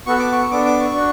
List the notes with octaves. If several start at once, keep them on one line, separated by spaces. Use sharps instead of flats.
B3 F#4 A4 C#6
D6
C#6
B3 D4 A4 D6
D6
C#6
D4 F#4